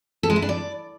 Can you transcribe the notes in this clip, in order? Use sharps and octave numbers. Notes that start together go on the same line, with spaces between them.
A4
G#3
E4
D4
D5